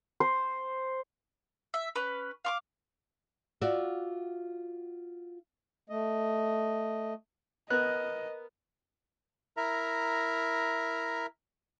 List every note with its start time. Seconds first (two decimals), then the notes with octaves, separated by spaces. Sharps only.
0.20 C5
1.74 E5
1.96 C#4 B4
2.45 F5 C#6 D6
3.61 F4 F#4 D5 E5
5.90 A3 D#5
7.70 B3 A#4 D#5 F#6
9.57 E4 A#4 E5 A#5